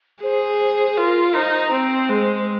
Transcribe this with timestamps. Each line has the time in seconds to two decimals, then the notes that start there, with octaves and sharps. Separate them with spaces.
0.22 G#4 C5
0.97 F4 A#4
1.35 D#4 C5
1.71 C4 C5
2.09 G#3